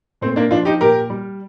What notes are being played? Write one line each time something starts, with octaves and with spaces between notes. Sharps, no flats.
A#2 A3 C4
A#3 D4
F3 D4 F4
D#4 G4
A#2 G4 A#4
G3